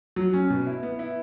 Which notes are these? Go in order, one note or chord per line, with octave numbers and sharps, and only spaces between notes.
F#3
C#4
B2
E4
B3
E4